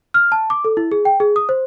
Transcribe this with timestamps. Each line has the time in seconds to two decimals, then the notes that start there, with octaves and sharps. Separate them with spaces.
0.14 F6
0.32 A5
0.50 D6
0.65 A4
0.77 E4
0.91 G#4
1.05 G5
1.20 G#4
1.36 D#6
1.49 C5